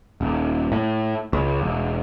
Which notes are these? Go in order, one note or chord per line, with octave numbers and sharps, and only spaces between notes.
D#1
A2
C#2
E1